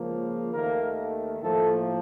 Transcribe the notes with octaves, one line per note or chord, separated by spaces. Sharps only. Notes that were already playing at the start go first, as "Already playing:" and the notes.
Already playing: C#2 C#3 F3 A#3
D#2 D#3 A3 A#3 A#4
A2 F3 A3 A#3 A4